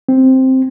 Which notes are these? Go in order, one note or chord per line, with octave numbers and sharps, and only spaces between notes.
C4